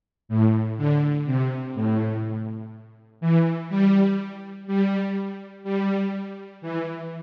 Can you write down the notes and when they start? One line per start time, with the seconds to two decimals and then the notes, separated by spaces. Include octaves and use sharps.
0.29 A2
0.78 D3
1.26 C3
1.75 A2
3.21 E3
3.69 G3
4.67 G3
5.64 G3
6.62 E3